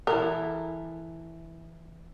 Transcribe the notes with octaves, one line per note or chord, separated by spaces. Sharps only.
E3 E4 A4 A#4